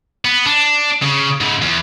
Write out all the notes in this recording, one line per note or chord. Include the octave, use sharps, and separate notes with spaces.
B3
D4
C#3
G#2 C#3
E2